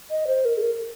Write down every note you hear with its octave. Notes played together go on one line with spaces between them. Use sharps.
D#5
C5
A#4
G#4
A#4